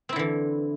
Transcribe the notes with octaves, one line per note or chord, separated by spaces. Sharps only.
D3 E3 C4 E4